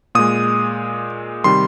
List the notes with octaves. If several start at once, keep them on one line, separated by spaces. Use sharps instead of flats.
A#2 G#3 D#6
C3 D#3 G3 C6